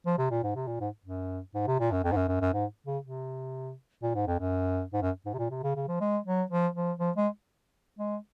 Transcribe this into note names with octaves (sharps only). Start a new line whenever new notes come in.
F3
C3
A#2
G#2
C3
A#2
G#2
F#2
G#2
C3
A#2
F#2
F2
G#2
F#2
F#2
F#2
G#2
C#3
C3
A#2
G#2
F2
F#2
G#2
F#2
G#2
C3
A#2
C3
C#3
C#3
F3
G#3
F#3
F3
F3
F3
G#3
G#3